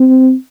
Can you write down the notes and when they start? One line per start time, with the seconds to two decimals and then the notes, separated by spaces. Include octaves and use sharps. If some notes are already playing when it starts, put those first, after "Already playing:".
Already playing: C4